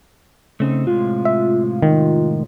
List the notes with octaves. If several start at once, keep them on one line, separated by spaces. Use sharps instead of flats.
C#3 A3 C4 D#4
A2 C3 G#3 F4
E5
D#3